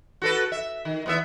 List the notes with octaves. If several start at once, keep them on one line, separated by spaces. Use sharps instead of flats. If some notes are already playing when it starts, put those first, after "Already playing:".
F#4 A4 B4
E5
D#3
E2 B3 E5